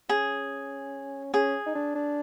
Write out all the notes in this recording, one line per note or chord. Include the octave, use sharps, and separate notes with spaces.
C#4 G#4
C#4 G#4
D#4
D4
D4